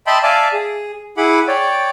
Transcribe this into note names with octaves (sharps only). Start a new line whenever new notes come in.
D#5 E5 G5 A5 B5 C6
D5 E5 F5 G#5 A5 D6
G#4
E4 G#4 F#5 B5 D6
C#5 D5 G5